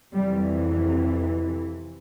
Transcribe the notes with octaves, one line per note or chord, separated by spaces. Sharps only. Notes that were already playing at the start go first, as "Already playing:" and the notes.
F2 C3 E3 G3